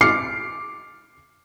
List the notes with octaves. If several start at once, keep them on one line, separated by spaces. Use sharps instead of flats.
D6 F6 C7 C#7